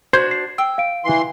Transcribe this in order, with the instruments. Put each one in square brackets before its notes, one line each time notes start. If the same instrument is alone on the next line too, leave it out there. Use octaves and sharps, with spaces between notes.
[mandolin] D4 F#4 G6 [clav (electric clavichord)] C5 [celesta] G#6
[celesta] C7
[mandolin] G5 [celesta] E6
[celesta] F5 D7
[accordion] E3 C6